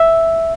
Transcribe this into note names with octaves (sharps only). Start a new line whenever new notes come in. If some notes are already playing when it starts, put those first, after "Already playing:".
Already playing: E5